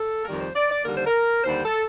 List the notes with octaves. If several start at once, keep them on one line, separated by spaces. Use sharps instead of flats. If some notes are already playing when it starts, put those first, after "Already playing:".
Already playing: A4
F2 D#3 G3 A#4
C5
D5
D5
D#2 D3 G3 A#4
C5
A#4
D#2 D3 G3 C5
A4